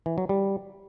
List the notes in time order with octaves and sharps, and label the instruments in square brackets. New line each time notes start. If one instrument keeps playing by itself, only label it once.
[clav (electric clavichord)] E3
F#3
G3